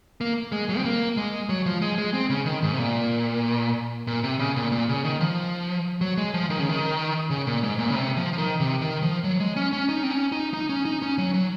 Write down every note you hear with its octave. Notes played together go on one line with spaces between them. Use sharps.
A#3
G#3
F#3
C4
A#3
G#3
F#3
F3
G#3
G#3
C4
C#3
D#3
G#2
C3
A#2
A#2
C3
C#3
A#2
A#2
C#3
D#3
F3
F#3
G#3
F3
D#3
C#3
D#3
C#3
A#2
G#2
A#2
C#3
C3
F3
F3
D#3
C3
D#3
F3
F#3
G#3
C#4
C#4
D#4
C4
C#4
D#4
D#4
C#4
D#4
C#4
F#3
F#3